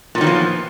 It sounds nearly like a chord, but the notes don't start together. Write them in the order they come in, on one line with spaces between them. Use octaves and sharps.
A#2 F#3 D#3 B3 F3